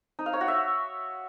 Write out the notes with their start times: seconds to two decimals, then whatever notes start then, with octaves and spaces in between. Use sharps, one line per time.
0.19 D#4
0.26 F5
0.33 C#5
0.41 F#4
0.48 E5